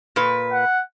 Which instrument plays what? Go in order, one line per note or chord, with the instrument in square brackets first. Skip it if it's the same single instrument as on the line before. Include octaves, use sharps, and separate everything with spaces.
[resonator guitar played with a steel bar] A#2 B4
[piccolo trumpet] F#5